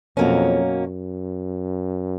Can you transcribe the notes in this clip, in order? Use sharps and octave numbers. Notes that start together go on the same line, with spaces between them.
F2 B2 F#3 A#3 C#4
F#2